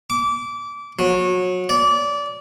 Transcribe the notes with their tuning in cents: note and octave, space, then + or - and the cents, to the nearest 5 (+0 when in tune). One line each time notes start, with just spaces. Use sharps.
D6 -25
F#3 -25
D5 -25